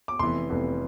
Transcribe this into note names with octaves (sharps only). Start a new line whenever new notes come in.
D6
F1 F2 E3 B3 C6
F1 F2 E3 B3